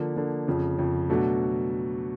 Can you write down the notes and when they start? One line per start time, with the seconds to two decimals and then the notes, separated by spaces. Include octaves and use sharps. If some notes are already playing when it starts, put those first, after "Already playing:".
Already playing: D3 F3 A#3
0.16 D3 F3 A#3
0.47 F2 C#3 F3
0.78 F2 C#3 F3
1.10 B2 F#3 A3 D4 F#4